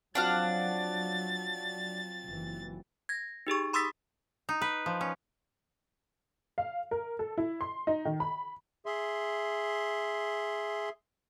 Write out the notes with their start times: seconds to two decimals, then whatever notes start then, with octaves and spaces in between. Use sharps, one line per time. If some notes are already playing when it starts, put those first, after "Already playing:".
0.15 F3 F#3 C4 D4 F#4 F#5 F6 A6
2.25 F#1 E3
3.09 G#6 A#6
3.47 D#4 G4 G#4 C#6
3.73 B5 C6 D#6 E6 A6 B6
4.49 D#4
4.61 B4
4.86 F3
5.01 C#4
6.58 F5
6.91 A#4
7.19 A4
7.38 E4
7.61 C6
7.87 D#4
8.05 D#3
8.20 B5
8.86 G#4 E5 C6